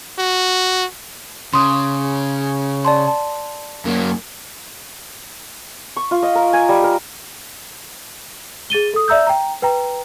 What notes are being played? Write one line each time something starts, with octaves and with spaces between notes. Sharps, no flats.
F#4
C#3 C6 D#6
D5 A5 C6
A5
F#2 A#3
C#6
F4
D#5
A#4
G#5
G3
A#4
G#4 A6 D#7 G7
A4 D#6
D5 E5 A#5 E6 G6
G5 A#5
B4 G5 A#5